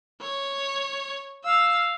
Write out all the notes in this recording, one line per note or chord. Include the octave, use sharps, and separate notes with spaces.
C#5
F5 E6